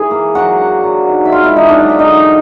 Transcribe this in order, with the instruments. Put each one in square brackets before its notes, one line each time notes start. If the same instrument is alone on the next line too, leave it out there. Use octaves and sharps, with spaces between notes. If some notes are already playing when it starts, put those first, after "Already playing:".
Already playing: [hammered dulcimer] E3 G#4 G#5
A#3
F#3 F#4 F#5
D4
F#3
D#4
E5
G#3 F4 F5
E4 E5
E3 D#4 D#5
D4 D5
F#3 D#5
E5
D#4 D#5
D3